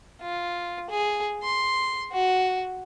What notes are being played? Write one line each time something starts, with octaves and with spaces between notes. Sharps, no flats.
F4
G#4
C6
F#4